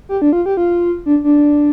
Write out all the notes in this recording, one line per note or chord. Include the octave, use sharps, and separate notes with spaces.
G4
D4
F4
G4
F4
D4
D4